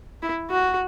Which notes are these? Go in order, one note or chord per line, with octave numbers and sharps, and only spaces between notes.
E4
F#4